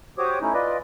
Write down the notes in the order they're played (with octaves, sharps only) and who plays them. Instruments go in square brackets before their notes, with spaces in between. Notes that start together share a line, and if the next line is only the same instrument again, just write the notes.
[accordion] F#4 G4 C5 C#5 D6 D#6
A3 C#4 D#4 E4
F4 B4 D5 D#5